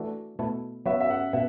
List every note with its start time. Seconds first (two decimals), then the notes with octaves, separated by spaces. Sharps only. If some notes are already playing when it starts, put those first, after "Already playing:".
Already playing: E3 A3 D4 F#4 A4
0.39 B2 A3 E4 A4
0.86 F#3 B3 F#4 E5
1.00 E5
1.10 F#5
1.33 B2 E5